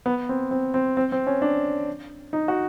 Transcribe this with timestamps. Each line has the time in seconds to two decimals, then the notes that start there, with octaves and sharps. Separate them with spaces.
0.06 B3
0.29 C4
0.51 C4
0.74 C4
0.97 C4
1.12 C4
1.27 C#4
1.42 D4
2.33 D#4
2.48 F#4